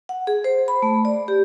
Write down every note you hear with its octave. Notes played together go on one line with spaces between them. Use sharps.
F#5
G#4
C5
B5
A3
D5
G4